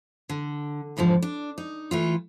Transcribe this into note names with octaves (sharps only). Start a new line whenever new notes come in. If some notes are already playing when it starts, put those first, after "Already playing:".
D3
E2 G#2 D3 F3
D4
D#4
E3 A3 F4